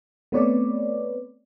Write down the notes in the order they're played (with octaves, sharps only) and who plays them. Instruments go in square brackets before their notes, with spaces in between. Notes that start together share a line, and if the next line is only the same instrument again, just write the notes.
[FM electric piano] A3 B3 C4 B4 C#5 D5